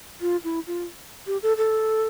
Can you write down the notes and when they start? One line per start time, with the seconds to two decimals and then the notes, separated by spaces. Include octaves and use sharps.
0.21 F4
0.44 E4
0.67 F4
1.27 G4
1.43 A4
1.57 A4